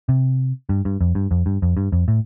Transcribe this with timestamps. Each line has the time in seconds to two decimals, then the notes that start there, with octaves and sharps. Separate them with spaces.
0.09 C3
0.69 G2
0.85 G2
1.01 F2
1.15 G2
1.31 F2
1.46 G2
1.62 F2
1.77 G2
1.92 F2
2.08 A2